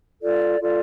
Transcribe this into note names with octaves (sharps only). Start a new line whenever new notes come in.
F4 A4 D5
F4 A4 D5